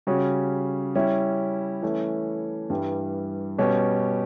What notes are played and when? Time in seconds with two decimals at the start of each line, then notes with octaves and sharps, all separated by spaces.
0.07 C#3 G3 C#4 F#4
0.95 G3 C#4 E4
1.82 E3 A3 C#4
2.70 G2 E3 G3
3.58 B2 G3 C#4 G4